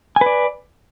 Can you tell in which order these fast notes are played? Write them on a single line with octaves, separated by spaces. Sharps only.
G#5 B4 D5